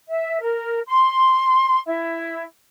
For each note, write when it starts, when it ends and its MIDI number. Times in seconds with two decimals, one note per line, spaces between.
0.08 0.36 76
0.40 0.79 70
0.86 1.78 84
1.85 2.41 64